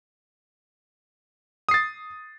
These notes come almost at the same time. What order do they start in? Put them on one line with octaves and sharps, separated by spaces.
D#6 C7 A6